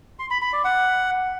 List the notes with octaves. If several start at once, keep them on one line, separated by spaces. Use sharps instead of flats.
C6
B5
B5
D5
F#5